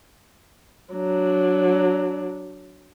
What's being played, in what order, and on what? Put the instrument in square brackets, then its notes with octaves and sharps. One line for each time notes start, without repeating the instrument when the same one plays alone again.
[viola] F#3 D4